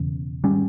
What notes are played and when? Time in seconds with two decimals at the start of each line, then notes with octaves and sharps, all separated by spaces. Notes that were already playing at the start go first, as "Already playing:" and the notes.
Already playing: E1 E2 C#3
0.44 G#1 G3 C#4